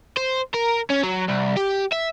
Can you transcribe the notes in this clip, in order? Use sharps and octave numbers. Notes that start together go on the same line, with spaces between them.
C5
A#4
C#4
F#3
C2
G4
E5